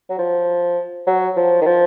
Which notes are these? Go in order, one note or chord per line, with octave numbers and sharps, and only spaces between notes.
F#3
F3
F#3
F3
D#3
F3